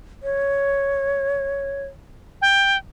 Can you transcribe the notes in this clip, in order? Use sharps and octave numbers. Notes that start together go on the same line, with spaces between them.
C#5
G5